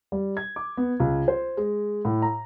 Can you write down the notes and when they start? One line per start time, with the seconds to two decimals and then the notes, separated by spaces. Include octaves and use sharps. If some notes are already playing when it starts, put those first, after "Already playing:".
0.12 G3
0.37 G#6
0.56 D6
0.77 B3
1.00 C#2
1.28 C5
1.57 G#3
2.05 A2
2.22 A#5